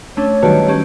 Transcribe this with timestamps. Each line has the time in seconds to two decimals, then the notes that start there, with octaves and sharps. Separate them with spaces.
0.17 A3 C#4 D4 C#5
0.43 D#3 F#3 G3 F#4 G4 B4 A5
0.68 C#4 G4